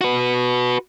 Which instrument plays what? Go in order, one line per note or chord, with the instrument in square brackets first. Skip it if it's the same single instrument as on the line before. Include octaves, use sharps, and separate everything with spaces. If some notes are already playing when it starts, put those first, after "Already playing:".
[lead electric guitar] F#4 B4